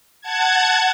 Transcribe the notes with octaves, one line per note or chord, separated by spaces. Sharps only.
F#5 A5 G#6